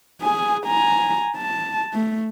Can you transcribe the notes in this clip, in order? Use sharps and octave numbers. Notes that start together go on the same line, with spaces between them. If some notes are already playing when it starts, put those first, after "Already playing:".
G#4 G#5
G#5 A#5
A5
A3